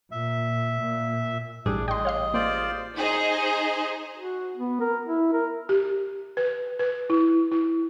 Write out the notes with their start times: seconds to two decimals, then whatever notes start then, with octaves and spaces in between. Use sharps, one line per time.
0.11 A#2 E5
0.80 A#2
1.66 A1 A2 G3 D4 G#4
1.88 D#5 G5 C6
2.05 C#5 F5 C6
2.34 A#3 F4 C5 D5
2.96 D#4 G#4 C5 D#5
4.16 F#4
4.57 B3
4.80 A#4
5.05 E4
5.33 A#4
5.69 G4
6.37 B4
6.79 B4
7.10 E4
7.51 E4